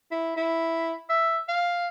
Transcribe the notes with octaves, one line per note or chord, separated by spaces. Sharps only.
E4
E4
E5
F5